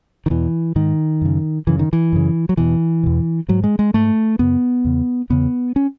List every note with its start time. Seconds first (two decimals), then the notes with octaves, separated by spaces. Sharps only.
0.26 D#3
0.30 E2 B2 E3
0.76 G#2 D#3
1.21 F#2 C#3
1.67 F#2 C#3 E3
1.79 D#3
1.93 E3
2.12 F#2 C#3
2.49 F#3
2.57 E2 B2 E3
3.03 E2 B2
3.48 G#2 F#3
3.64 G#3
3.79 G#3
3.94 G#2 A3
4.39 F#2 C#3 B3
4.85 E2 C#3
5.30 E2 C#3 B3
5.76 C#4